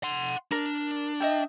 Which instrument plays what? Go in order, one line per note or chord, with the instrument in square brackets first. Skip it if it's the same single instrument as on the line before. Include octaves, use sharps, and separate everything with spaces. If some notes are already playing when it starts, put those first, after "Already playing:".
[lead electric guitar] F#5 C6
[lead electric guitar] D4 [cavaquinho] A#4
[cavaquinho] D#5 E5 G5